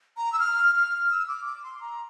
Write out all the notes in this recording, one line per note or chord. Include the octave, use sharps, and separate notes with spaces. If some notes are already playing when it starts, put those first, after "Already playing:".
A#5
E6
F6
F6
E6
D6
D6
C6
A#5